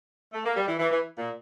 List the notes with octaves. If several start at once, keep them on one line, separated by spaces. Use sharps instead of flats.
A3
A#3
G3
E3
E3
E3
A#2